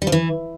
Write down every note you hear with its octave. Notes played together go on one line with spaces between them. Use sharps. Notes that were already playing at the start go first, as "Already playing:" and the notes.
G3
F3
E3